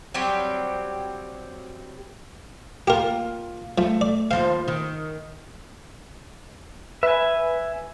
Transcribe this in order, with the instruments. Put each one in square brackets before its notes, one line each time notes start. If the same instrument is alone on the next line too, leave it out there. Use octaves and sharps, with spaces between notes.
[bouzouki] F#3 G3 C4 G4
[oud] A#3 F4 [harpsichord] G4 A#4
[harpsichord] F3 [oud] A3
[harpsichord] D5
[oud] D#2 F3 C5 [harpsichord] F5
[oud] D#3
[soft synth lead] B4 [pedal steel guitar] E5 G#5